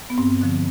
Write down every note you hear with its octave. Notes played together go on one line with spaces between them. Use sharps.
B3
G2 C4
D3 F3